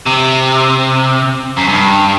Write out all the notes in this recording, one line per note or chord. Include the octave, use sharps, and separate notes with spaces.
C3
F#2
G2